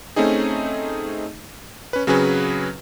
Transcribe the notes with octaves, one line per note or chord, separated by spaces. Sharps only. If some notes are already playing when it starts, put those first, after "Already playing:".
A3 C4 C#4 D#4 G#4
C#4 B4
C#3 F#3 C4 C#4 G#4 B4